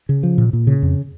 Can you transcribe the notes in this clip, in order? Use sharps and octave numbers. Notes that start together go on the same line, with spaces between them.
C#3
F3
A#2
A#2
C#3
F2